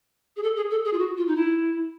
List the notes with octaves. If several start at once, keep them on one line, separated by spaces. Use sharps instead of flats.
G#4
A4
G#4
A4
G#4
F4
F#4
F4
D#4
E4